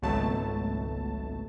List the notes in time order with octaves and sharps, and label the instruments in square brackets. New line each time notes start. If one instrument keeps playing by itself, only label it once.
[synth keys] G#1 C#2 B2 F#3 A3 A5